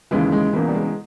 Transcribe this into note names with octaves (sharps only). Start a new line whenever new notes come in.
D#2 C#3 E3 G#3
G#3
E1 E2 C#3 E3 A#3
G3
G#3